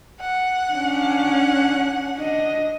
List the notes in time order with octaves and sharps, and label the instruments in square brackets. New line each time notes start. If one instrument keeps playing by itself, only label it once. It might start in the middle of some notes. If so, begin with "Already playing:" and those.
[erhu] F#5
[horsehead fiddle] C#4 D4
D4 D#5